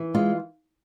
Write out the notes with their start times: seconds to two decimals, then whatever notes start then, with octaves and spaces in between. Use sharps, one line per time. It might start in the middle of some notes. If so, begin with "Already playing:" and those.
Already playing: E3
0.14 G#3 F4